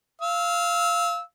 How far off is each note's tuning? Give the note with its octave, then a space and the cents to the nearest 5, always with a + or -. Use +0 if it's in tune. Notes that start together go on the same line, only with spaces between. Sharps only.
F5 -10 E6 -25